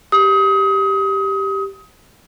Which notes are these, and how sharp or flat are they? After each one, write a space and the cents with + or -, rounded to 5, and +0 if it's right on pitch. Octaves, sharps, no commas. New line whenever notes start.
G4 +0 D#6 +30